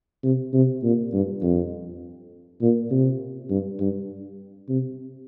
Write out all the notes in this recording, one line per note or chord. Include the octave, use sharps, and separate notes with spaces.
C3
C3
A#2
G2
F2
A#2
C3
G2
G2
C3